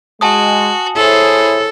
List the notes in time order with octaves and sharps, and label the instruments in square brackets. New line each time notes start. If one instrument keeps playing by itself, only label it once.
[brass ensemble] G#3 [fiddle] F#4 [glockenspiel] G#5 A5 D#6
[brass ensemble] E4 C#5 [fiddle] G#4 C5 [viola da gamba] A4